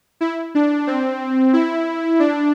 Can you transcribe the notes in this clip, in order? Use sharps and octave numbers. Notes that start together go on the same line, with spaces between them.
E4
D4
C4
E4
D4